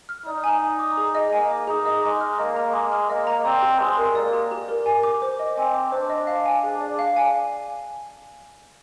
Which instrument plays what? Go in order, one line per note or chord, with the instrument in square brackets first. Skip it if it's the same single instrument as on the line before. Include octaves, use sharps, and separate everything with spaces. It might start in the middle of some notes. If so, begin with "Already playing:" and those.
[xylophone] F6
[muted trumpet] D#4 [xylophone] D5
[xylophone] G#5
G#5
D6
G#4
D#5
[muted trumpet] A#3 [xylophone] G#5
[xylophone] D6
[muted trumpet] D#4 [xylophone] G#4
[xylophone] D#5
[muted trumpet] G#3 [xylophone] D6
[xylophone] F6
[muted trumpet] A#3 [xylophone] D#5
[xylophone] A#5
[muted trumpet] G#3 [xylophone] D6
[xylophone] F6
[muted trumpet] A#3 [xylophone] D#5
[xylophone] A#5
[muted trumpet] C4 [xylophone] D5
[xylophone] G4
[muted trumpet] G#3 [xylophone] G4
[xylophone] A#4
[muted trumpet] A#3 [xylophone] D5
[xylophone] G4
G4
A#4
G#5
D6
C5
D#5
[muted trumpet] C4 [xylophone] G#5
[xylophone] D6
[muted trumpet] D4 [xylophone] C5
[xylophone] D#5
F5
G#5
G#4
D5
F5
G#5